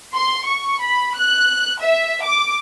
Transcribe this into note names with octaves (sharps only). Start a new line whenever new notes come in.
C6
C#6
B5
F#6
E5
D6